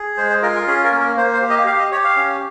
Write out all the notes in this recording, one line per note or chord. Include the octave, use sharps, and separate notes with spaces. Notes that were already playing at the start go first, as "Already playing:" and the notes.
Already playing: G#4
G#3 C5
C5
F4 A#4
A#4
C#4 G#4
A#4
A#3
A#4
A#3 C5
C5
G4
D#5
G4 F5
D#5
G4 C#5
F5
C#4